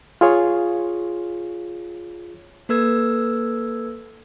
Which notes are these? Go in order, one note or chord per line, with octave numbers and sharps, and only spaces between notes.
F4 G#4 C#5
A#3 A4 B4 E6 G#6